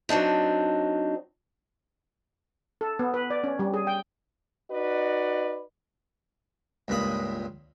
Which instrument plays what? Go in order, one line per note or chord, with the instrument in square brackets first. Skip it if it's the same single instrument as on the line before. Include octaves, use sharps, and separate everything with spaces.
[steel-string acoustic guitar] F#3 C4 D4 D#4
[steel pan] A4
B3
B4
D5
C#4
G3
G#4
G5
[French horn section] D#4 F#4 B4 D5 D#5
[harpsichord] C#2 G2 A#2 B5 D#6